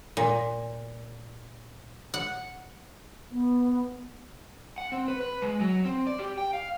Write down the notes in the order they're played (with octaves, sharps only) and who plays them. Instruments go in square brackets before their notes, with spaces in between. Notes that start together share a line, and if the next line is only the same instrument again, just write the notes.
[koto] A#2
F#5
[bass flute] B3
[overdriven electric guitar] F#5
C4
B4
B4
G#3
F#3
C4
D5
G4
G5
F5